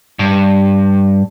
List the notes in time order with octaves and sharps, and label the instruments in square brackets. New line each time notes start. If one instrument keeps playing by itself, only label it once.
[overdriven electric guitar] G2